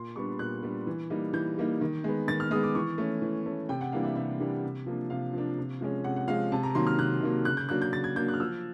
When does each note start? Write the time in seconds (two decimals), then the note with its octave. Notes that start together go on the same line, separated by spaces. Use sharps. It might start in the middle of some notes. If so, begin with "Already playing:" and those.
Already playing: A#2 C6
0.16 G3 B3 D4 C#6
0.39 A#2 F#6
0.63 G3 B3 D4
0.87 E3
1.10 G3 A#3 D#4
1.33 E3 G6
1.58 G3 A#3 D#4
1.81 D#3
2.04 G#3 B3
2.28 D#3 A6
2.40 F6
2.51 G#3 B3 D#6
2.63 D6
2.75 E3 C#6
2.98 A3 C#4
3.22 E3
3.46 A3 C#4
3.69 C3 G5
3.81 F#5
3.92 E3 G3 A#3 D4 F5
4.04 E5
4.16 C3 E5
4.40 E3 G3 A#3 D4
4.64 C3
4.86 F3 A#3 D4
5.10 C3 F5
5.33 F3 A#3 D4
5.58 C3
5.81 F3 G#3 C#4
6.04 C3 F#5
6.16 F#5
6.28 F3 G#3 C#4 F5
6.52 C3 A5
6.63 A#5
6.75 D#3 F#3 A#3 C6
6.87 F6
6.99 C3 F#6
7.23 D#3 F#3 A#3
7.45 C#3 F#6
7.57 G6
7.69 F#3 A#3 D4 F#6
7.82 G6
7.93 C#3 A6
8.04 G#6
8.16 F#3 A#3 D4 G6
8.28 F#6
8.34 F6
8.40 F3 E6